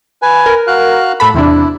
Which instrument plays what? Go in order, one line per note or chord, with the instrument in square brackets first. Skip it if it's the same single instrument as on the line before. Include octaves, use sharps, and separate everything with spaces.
[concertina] B4 G#5
[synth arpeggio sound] A#4
[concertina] F#4 F5 F#6
[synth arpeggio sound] A2 A4 B5
[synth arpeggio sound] E2 C3 D4 [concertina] E4